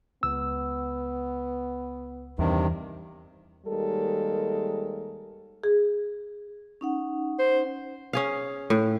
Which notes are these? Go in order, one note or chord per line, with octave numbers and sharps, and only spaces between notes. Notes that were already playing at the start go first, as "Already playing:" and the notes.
C#2 B3 E6
E2 G2 C3 D#3
D#2 G3 G#3 A4 A#4
G#4
C#4 D#4 F#5
C5
C#4 G#4 F5
A2